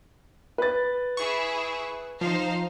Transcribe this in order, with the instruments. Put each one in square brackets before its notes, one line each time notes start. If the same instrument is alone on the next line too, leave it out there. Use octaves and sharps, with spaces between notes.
[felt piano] B4 A6
[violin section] E4 G#4 E5 [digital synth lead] C#6
[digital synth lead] F3 [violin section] D#4 C5 F5